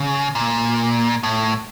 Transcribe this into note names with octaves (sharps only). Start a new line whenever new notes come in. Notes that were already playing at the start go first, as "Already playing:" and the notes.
Already playing: C#3
A#2
A2